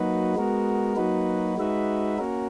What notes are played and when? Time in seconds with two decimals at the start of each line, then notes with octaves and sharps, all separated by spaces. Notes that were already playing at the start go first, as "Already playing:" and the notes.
Already playing: F#3 A#3 D#4 F#4 B4
0.35 G#3 B3 F#4 A#4
0.96 F#3 A#3 D#4 F#4 B4
1.58 G#3 D#4 F#4 B4 E5
2.18 A#3 C#4 F#4 A#4